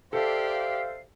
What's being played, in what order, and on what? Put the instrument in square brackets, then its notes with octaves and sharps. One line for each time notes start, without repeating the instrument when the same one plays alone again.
[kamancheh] G4 D5 [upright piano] A4 [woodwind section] C5 E5 F5